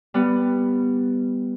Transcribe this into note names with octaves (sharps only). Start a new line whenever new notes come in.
G3 B3